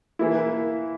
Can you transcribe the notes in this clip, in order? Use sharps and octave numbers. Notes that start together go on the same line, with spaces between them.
E3 A#3 E4